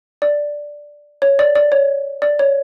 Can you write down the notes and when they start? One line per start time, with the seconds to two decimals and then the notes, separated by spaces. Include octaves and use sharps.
0.22 D5
1.22 C#5
1.39 D5
1.55 D5
1.72 C#5
2.22 D5
2.39 C#5